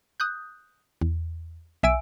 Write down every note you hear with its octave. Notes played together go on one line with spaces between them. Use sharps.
D#6 F#6 G6
E2
B1 E5 G#5 E6 D7